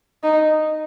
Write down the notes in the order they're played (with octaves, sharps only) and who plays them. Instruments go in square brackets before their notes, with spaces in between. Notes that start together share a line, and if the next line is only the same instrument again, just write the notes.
[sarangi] D#4